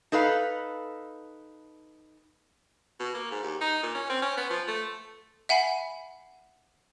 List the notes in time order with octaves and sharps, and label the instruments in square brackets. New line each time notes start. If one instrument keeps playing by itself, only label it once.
[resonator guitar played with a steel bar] D#4 A4 B4 F5
[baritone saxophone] B2
A#3
G#2
D#2
D#4
A#2
C#4
C4
C#4
B3
F3
A3
[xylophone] E5 F#5 G#5 B5 C7